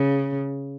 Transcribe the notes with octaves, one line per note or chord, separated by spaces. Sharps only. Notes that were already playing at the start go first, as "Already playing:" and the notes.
Already playing: C#3